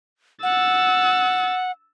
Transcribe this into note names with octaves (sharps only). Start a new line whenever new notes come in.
F#5 E6 A6